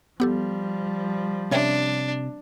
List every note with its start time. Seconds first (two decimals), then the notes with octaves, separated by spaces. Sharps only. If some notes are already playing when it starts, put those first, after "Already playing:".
0.20 F3 G3 B3 G4 A4
1.51 C3 C#4 D4 C#5 E5